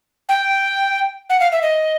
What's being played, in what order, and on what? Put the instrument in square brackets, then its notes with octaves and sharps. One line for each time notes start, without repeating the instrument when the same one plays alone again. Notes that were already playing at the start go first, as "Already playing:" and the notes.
[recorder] G5
F#5
F5
E5
D#5